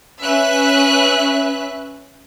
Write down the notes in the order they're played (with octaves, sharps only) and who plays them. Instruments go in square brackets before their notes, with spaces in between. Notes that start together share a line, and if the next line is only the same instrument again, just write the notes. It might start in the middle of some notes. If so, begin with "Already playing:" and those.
[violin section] C#4 B4 E5 F#6